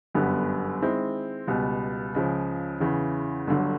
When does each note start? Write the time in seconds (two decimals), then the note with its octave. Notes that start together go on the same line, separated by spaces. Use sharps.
0.15 G1 F#2 D3 G3 B3
0.81 D#3 G#3 C4 E4
1.47 C#2 B2 G3 B3
2.15 C#2 C#3 F3
2.80 E2 C#3 E3
3.47 G1 G2 D3 F#3